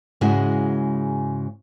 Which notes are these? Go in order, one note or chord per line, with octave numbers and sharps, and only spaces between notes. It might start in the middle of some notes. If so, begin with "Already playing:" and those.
G#2 C#3 G#3 E4 F#4 G#4